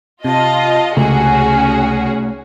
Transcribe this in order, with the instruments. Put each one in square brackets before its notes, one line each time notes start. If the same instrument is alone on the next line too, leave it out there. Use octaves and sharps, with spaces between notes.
[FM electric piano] C3 [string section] F4 D#5 [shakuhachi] A5
[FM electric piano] C#2 [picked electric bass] C3 A3 [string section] C#4 F#4 G#4 [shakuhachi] G#5